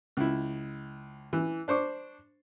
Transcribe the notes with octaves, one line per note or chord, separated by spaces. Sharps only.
C#2 E4
E3
D4 C5 C#6 D6